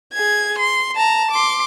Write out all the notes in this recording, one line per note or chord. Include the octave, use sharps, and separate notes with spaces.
G#4 G#6
C6
A5 A#5
C6 D6